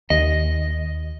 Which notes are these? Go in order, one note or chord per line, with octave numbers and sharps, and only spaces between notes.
D#2 D#5